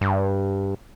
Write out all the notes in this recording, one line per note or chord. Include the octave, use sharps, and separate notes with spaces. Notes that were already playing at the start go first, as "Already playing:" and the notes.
G2